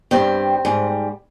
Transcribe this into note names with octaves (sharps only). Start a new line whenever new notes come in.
G2 G3 C4
G#2 G3